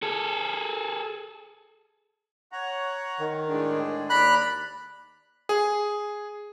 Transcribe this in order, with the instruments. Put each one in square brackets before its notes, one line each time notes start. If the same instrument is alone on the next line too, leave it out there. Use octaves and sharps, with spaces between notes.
[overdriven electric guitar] G#4 A4
[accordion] C#5 F#5 A#5
[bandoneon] D#3
[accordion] A2 G#3 D4
[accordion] D#2 D5 A#5 [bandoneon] B5 F#6
[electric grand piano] G#4